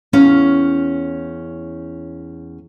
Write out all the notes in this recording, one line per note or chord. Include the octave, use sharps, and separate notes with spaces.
E2 C#4 C#5 F5